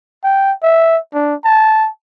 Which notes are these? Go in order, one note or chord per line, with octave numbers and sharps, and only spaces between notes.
G5
E5
D4
A5